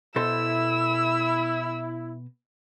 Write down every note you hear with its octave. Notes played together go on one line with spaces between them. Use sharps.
B2 E4 A4 C5 E6